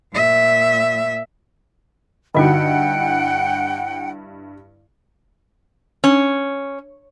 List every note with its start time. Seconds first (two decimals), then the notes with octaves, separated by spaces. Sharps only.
0.14 A#2 E5
2.35 G2 D3 D#4 E4 F#4 D#5 F#5 G5
6.04 C#4